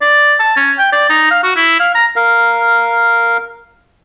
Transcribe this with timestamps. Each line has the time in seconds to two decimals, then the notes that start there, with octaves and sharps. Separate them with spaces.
0.01 D5
0.40 A5
0.57 C#4
0.79 G5
0.92 D5
1.10 D#4
1.31 F5
1.44 F#4
1.56 E4
1.80 F5
1.95 A#5
2.16 A#4 F5